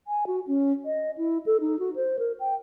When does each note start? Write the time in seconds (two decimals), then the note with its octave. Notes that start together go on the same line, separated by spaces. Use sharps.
0.07 G#5
0.27 F#4
0.47 C#4
0.85 D#5
1.18 E4
1.46 A4
1.61 D#4
1.79 F#4
1.96 C5
2.19 A#4
2.40 G5